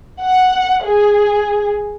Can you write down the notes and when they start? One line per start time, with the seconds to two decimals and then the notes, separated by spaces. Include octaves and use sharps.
0.21 F#5
0.86 G#4